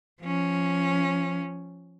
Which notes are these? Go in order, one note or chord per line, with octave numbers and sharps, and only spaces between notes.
F3 C#4